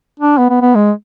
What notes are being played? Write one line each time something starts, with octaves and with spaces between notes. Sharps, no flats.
D4
B3
B3
B3
G#3